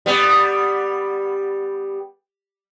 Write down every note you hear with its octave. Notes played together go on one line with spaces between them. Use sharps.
G3 B3